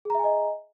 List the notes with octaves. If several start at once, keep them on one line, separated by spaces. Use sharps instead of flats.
G#4 D#5 E5 G#5 A#5